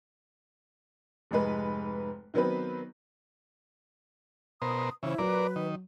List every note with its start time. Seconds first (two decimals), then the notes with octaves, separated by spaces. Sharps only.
1.31 F1 G#2 G#3 B4
2.34 D#3 F#3 B3 C4 B4
4.62 B2 A#4 C5 D#6
5.03 C#3 E3 E4 C5
5.18 F#3 A#4 B4 D5
5.56 D#3